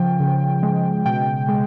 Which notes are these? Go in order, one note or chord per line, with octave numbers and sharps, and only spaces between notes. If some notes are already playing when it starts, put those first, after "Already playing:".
Already playing: C#3 F3 G5
C#3
G#3
B2 G5
G#3